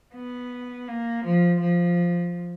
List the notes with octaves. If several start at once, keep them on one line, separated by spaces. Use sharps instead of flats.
B3
A#3
F3
F3